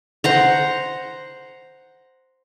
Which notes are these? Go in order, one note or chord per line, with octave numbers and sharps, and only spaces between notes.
C5 F#5 A#5